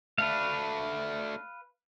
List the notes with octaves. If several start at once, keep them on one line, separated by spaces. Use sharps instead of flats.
A3 D4 B4 F5